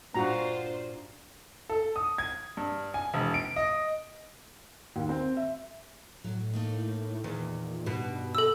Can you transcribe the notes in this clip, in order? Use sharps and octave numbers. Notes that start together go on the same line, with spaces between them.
G2 A#2 D4 F4 F#4 C5 A#5
A4
D#6
G#6
G2
G#5
E1
D7
D#5
D#2
C4
E5
A2 F#3
A3 A#3 D#4
E2 A#2 D#3
G2 B2
A4 E6